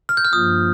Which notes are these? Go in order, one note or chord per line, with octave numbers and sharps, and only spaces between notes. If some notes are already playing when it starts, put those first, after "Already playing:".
F6
G6
F6
G2 F3 A#3 F4 D#6